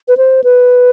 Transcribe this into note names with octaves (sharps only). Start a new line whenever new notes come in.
B4
C5
B4